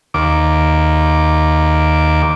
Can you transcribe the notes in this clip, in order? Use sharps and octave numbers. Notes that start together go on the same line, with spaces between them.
D#2 D6